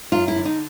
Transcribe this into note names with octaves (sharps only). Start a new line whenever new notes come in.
F#2 F4
E4
D3
D#4